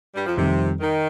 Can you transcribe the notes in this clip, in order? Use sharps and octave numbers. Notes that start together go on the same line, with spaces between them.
G2 G3
F2 F3
F2 C3 D#3 G3
D#3